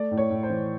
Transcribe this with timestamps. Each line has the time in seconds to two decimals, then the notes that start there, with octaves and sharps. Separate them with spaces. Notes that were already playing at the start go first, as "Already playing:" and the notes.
Already playing: A3 D5
0.11 A2
0.17 C#5
0.30 A2
0.43 C5
0.50 E3